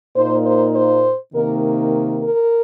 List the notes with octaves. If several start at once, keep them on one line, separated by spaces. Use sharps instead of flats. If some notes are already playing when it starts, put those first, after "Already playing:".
A#2 A#3 D#4 C5
C5
C5
C3 D#3 A#3 D#4 A#4
A#4